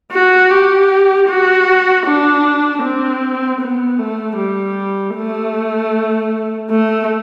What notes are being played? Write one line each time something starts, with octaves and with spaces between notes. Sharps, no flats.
F#4
G4
F#4
D4
C4
B3
A3
G3
A3
A3